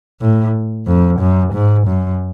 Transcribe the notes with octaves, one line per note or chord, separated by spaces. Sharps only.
A2
F2
F#2
G#2
F#2